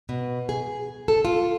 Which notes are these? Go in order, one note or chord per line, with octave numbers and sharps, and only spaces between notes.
B2
G#4
A4
F4